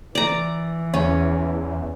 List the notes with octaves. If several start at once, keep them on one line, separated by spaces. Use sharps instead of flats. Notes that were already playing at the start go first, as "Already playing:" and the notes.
E3 D5 A#5
E2 C#4